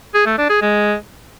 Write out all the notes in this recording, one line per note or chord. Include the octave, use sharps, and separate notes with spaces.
G#4
A3
D4
G#4
G#3